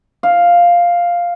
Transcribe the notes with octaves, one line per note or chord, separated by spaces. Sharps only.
F5